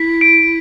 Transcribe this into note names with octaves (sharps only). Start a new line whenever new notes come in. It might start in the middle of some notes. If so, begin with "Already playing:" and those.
Already playing: E4 B6
D7